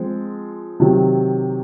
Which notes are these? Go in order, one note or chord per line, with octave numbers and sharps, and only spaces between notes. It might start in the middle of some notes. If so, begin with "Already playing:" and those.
Already playing: F3 G#3 C4
C3 D#3 F#3